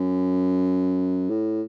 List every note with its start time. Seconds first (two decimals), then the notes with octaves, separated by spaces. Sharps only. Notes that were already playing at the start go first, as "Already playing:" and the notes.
Already playing: F#2
1.30 A2